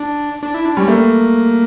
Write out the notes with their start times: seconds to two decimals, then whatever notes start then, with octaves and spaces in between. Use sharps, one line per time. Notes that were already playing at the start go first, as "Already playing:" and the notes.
Already playing: D4
0.43 D4
0.54 E4
0.65 D4
0.76 G3 C#4
0.88 A3 A#3